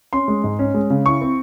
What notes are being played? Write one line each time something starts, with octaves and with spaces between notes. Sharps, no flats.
C#4 C6
G#3
G#2
C#4
G#3
C#3
E4 C#6
C4